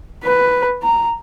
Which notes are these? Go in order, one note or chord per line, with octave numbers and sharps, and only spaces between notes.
B4
A#5